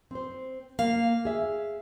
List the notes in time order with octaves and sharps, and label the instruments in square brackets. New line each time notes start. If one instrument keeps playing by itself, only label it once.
[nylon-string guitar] C4 C5
[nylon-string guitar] A#3 [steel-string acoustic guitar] F5
[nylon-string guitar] G#4 E5